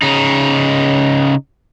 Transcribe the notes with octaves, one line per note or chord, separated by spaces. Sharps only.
C#3 D#4